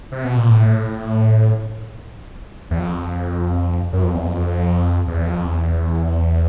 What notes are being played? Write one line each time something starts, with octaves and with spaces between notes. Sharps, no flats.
C3
B2
A#2
A2
E2
F2
F#2
F2
E2
F2
E2
F2
E2